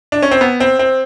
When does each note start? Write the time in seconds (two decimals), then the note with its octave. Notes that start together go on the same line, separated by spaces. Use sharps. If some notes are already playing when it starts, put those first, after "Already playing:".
0.12 D4
0.23 C#4
0.31 C4
0.41 B3
0.60 C4
0.79 C4